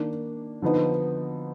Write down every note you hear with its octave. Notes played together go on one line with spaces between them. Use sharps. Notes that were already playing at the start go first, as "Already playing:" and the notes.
Already playing: D#3 A#3 D4
D3 F3 B3 D#4